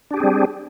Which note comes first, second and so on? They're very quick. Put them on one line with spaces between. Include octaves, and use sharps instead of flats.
D4 G4 G#4 C4 G3